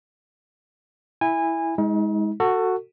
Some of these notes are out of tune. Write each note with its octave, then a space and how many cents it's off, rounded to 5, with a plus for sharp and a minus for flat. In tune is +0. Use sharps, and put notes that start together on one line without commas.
E4 +0 G#5 -20
G#3 -5 D#4 +40
F#4 +0 A4 +25